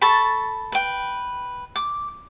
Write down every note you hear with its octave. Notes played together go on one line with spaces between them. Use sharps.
A4 A5 B5 C#6
B4 G5
D6